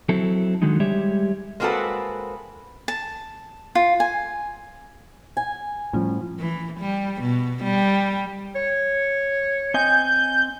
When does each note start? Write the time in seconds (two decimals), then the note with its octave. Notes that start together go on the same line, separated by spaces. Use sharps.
0.09 F#3 C4 E4 A4
0.62 D3 D#3 F#3 G#3 D#4
0.80 G3 G#3 G4 C#5 E5
1.60 G#3 A#3 C4 F#4 A4 B4
2.88 A5
3.75 F4
4.00 G#5
5.37 G#5
5.93 A2 F3 G3 C#4
6.39 E3
6.80 G3
7.22 B2
7.64 G3
8.56 C#5
9.74 C4 D#5 G#5 G6